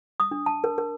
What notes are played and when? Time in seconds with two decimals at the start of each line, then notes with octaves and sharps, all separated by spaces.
0.20 D#6
0.31 D4
0.46 A5
0.64 A#4
0.78 A#4